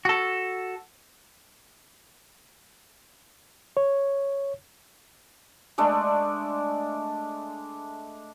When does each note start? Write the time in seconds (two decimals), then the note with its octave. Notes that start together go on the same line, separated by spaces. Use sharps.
0.05 F#4 A4
3.77 C#5
5.78 G#3 A3 D4